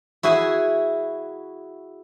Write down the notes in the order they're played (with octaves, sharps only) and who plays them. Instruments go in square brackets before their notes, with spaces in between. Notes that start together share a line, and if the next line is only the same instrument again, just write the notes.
[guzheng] E4 F#4 G#4 G#5